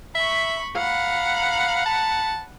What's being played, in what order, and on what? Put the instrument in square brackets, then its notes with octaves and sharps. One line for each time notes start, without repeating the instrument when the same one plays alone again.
[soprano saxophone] E5 [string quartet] B5 C#6
[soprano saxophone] F5 [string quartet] F#5 A#5 B5
[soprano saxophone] A5